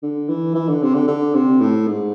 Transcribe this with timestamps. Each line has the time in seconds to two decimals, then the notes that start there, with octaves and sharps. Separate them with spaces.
0.03 D3
0.29 E3
0.55 E3
0.68 D3
0.82 C3
0.94 D3
1.08 D3
1.34 C3
1.61 A2
1.87 G#2